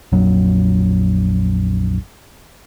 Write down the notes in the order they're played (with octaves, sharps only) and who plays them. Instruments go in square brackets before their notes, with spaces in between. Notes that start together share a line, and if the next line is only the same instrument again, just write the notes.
[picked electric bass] A#1 F2 F#3